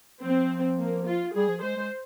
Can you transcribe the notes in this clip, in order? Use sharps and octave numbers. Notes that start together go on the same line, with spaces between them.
F3 C4
A#3
F4
G3 G#4
F3
G#3 C5
G#3